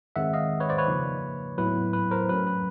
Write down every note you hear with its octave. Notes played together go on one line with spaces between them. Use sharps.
D#3 G#3 C4 E5 F#5
D#5 F5
B4 C#5
C5 D5
B4 C#5
C#3 F3 A#3 D#4
A2 F#3 B3 E4 B4
B4
A#4 C5
F#3 A3 C#4 B4
B4